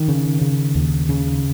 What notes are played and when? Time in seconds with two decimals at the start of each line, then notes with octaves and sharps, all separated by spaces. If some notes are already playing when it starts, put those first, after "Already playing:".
Already playing: D#3
0.08 C#3
0.41 C#3
0.75 D#2
1.09 C#3